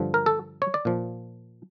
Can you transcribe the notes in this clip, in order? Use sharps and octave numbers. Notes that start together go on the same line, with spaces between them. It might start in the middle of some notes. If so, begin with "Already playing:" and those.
Already playing: G2 D3 F3
A#4
A4
C#5
D5
A#2 F3